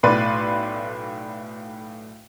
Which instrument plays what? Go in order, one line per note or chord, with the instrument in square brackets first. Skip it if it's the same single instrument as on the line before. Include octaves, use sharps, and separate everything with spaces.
[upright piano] B1 A2 B4 D5 C6